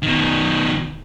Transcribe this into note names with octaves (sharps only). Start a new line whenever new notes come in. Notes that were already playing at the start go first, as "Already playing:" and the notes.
B2 D#3